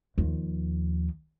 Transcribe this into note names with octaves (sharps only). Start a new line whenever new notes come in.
D#2 F3